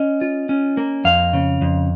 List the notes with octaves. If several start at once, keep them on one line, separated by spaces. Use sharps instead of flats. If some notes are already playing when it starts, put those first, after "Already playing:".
Already playing: C#4 D#5
F4
C#4
A#3
F2 F5
C#3
F2